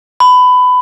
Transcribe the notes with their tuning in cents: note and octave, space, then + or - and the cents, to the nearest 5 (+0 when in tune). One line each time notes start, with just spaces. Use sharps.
B5 +20